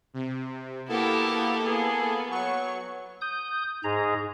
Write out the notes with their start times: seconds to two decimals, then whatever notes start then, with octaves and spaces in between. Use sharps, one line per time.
0.14 C3
0.89 B2 A#3 B3 E4 G4 A4
1.64 B3 G#4
2.30 F#3 C#6
3.21 D#6 G6
3.84 G#2 G#4 A#5